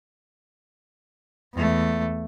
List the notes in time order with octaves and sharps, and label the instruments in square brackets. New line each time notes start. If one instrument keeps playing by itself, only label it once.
[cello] E2 A3